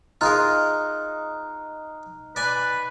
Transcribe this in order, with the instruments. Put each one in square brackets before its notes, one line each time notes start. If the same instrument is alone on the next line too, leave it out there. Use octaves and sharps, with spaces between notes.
[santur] D#4 [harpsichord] F4 G#4 A#4 [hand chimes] F6 F#6
[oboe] B4 [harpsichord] D5 G#5